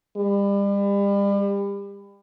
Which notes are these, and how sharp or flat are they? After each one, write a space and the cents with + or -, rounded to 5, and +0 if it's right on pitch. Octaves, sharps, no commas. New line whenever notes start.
G3 +35